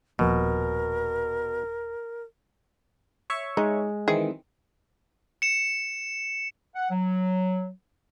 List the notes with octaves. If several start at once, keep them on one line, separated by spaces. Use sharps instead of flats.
D#1 B2 F3 A#3 A#4
C#5 E5 C#6
G#3 D#4
D#3 E3 C4 G#4
C#7 E7
F#5
F#3